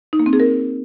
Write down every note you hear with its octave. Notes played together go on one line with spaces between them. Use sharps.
D#4
A#3
C4
G#4
A#4